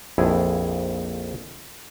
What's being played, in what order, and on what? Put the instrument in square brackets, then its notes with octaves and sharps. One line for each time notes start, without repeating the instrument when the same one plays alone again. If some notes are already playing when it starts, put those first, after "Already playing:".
[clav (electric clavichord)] A#1 F2 E4 G#4